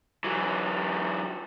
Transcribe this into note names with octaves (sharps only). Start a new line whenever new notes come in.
E3 F#3